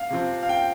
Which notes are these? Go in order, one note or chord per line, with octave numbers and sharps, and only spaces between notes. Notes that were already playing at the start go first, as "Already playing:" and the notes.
Already playing: F5
C3 F3 C4
F5
G5